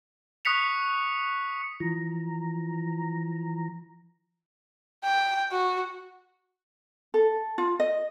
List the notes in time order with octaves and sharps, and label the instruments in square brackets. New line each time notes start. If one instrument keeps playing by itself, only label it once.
[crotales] C#6 D#6 F#6 B6 C#7 F7
[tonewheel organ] E3 F3 A#5
[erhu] G5
F#4
[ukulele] A4
F4
D#5